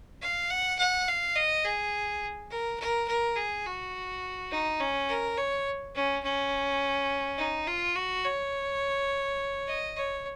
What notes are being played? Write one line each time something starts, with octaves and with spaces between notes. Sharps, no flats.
F5
F#5
F#5
F5
D#5
G#4
A#4
A#4
A#4
G#4
F#4
D#4
C#4
A#4
C#5
C#4
C#4
D#4
F4
F#4
C#5
D#5
C#5